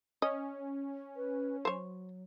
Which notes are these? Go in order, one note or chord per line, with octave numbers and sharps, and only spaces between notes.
C#4 D#5
B4
F#3 C5 C#5